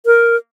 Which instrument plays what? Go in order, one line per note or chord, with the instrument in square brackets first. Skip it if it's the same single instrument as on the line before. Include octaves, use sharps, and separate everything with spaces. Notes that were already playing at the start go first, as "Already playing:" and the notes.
[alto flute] A#4